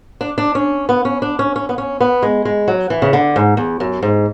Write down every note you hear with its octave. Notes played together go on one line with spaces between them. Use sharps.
D4
D4
C#4
B3
C#4
D4
C#4
C#4
B3
C#4
B3
G#3
G#3
F#3
E3
C#3
D3
G#2
E2
F#2
G#2